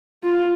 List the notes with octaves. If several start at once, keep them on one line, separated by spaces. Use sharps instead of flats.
F4